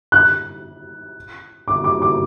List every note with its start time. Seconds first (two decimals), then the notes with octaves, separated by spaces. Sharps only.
0.12 F#6
1.68 D6
1.84 D6
2.02 D6